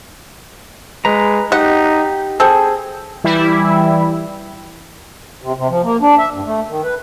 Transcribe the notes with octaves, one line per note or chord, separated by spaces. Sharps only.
G#3 B4 A#5
D#4 G4 F#5
C4 G#4 A4
E3 G3 E4
C3
C3
F3
A#3
D4
E5
G2
A3
D#3
B4